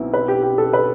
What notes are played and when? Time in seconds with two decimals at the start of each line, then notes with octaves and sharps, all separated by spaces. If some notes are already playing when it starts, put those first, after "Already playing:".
Already playing: B1 B2 C4 E4
0.14 B4
0.28 G4
0.43 G4
0.58 A4
0.73 B4